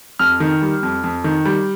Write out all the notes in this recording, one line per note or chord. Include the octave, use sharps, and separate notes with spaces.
F2 F6
D#3
G3
F2
F2
D#3
G3